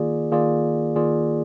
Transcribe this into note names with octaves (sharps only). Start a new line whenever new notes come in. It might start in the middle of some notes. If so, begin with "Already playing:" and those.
Already playing: D#3 A#3 F4 G#4 D5
D#3 A#3 F4 G#4 D5
D#3 A#3 F4 G#4 D5